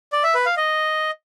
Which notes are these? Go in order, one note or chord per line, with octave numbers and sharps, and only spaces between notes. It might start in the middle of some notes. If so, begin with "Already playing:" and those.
D5
E5
B4
F5
D#5